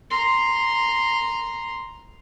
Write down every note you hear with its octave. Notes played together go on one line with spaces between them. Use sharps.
A#5 C6